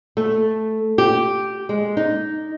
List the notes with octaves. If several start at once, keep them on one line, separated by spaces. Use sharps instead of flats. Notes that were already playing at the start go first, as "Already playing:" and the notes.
A3
G4
G#3
D#4